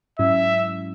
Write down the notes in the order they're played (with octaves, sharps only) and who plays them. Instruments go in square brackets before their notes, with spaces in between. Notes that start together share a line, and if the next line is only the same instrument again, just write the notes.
[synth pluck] G#2 F#3 C#4 E4 [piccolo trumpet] E5